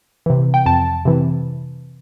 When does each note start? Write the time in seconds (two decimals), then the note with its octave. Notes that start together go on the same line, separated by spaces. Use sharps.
0.26 C3 E3
0.54 G5
0.66 F2 A5
1.05 C3 E3